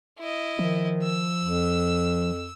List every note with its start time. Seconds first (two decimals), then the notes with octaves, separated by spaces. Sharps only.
0.19 E4 D#5
0.59 D#3 F3
1.03 E6
1.44 F2